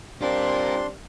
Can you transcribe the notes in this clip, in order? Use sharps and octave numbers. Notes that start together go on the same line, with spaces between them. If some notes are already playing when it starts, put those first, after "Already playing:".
G3 C4 D4 F4 A#4 C6